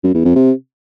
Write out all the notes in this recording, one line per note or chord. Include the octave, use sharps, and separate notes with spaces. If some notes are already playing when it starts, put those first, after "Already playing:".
F#2
E2
F2
C3